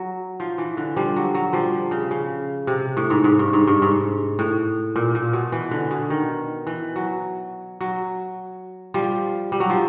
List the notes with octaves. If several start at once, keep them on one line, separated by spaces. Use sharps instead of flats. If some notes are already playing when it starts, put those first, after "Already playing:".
Already playing: F#3
F3
E3
D3
F3 G3
F#3
F#3
F3 G3
C#3
C#3
C3
A2
G#2
G#2
G2
G#2
G2
G#2
A2
A#2
A#2
B2
E3
D3
B2
D#3
E3
F#3
F#3
F3 G3
G3
F#3
F3